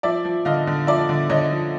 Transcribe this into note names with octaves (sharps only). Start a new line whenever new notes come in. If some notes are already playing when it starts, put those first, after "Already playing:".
F3 D5 E5
F3
D3 D#5 F5
D3
F3 D5 E5
D3
D3 C#5 D#5
F3